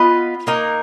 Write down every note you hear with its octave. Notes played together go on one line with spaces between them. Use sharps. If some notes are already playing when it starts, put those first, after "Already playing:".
Already playing: B3 F4 B4 D#5
A#3 D#4 A#4